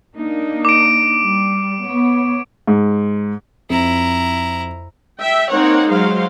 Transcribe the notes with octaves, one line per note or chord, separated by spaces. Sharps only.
A#3 D4 D#4
D6 D7
G3
B3 C#5
G#2
F2 E4 A#5
E5 G5
A#3 C4 D#4 C#5 F#5
F#3 G#3 C5 F5